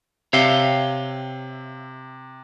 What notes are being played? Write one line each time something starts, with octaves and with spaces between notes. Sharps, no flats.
C3 C#5 E5 F5 G5